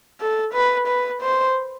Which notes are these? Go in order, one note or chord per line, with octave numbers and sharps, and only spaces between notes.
A4
B4
B4
C5